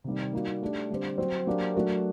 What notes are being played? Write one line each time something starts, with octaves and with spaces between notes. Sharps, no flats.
C3 D#3 G3
G3 A#3 D#4 F#4
A3 D4 G4
D3 G3 C4 G4 C5
F#3 C4 F#4 C5
F#3 A#3 D4 G4 C5
F#3 A3 D4 F#4 A#4